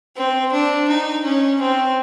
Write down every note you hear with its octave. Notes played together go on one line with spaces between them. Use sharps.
C4
D4
D#4
C#4
C4